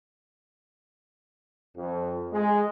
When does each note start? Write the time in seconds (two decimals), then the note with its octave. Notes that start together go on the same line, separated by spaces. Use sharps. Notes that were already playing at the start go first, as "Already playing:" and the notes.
1.76 F2
2.32 G#3